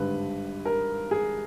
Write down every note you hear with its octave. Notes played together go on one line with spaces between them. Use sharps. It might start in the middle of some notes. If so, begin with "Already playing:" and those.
Already playing: G#1 G2 D3 G3 B4
A#4
G#4